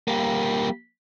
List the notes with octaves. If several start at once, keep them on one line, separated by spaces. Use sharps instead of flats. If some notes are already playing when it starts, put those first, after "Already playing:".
G3 A#3